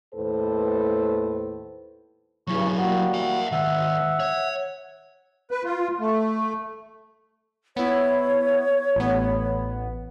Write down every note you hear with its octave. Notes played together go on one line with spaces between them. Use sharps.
D#2 A2 A4 B4 C5
G2 C#3 F#3 E4 C#6
G3 A#3 F#4
E5 F#5
D#3 G#3 E5 F#5
C#5
B4
F4
A3
B3 E4 C#5
A1 B3